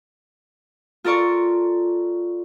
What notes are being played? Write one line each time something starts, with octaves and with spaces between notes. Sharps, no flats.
F4 A4 A#4 D5 C#6